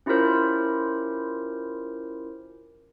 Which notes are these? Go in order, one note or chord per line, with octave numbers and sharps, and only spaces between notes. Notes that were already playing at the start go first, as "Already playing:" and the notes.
C#4 E4 F4 G4 A#4 C5